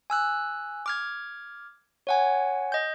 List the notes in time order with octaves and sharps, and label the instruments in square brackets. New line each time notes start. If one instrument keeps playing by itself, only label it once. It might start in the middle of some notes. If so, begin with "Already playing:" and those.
[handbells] G#5 E6 F#6
D6 F6 G#6
C#5 F#5 G#5
D#5 G6